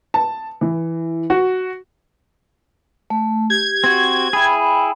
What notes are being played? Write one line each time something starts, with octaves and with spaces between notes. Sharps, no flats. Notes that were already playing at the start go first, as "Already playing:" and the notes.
A5
E3
F#4
A3
G4 G#6
C4 F#4
E4 G#4 G5 B5